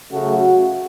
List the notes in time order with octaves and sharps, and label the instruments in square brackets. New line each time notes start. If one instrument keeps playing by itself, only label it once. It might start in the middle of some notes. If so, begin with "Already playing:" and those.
[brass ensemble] C#3 F#3 A3 F#4